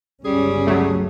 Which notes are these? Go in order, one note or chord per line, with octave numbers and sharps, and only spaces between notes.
G1 C#2 G3 C#4 G#4
F#3 A3